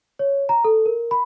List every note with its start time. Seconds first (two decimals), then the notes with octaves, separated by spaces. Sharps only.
0.19 C#5
0.49 A#5
0.64 A4
0.86 A#4
1.11 B5